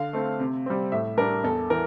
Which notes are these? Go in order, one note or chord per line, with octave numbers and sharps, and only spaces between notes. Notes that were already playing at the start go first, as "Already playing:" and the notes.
Already playing: D3 F5
A3 C4
C3
G3 C4
A2 E5
G3 D4 A#4
E2 A4
E3 A#4